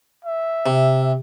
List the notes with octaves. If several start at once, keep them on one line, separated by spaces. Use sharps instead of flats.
E5
C3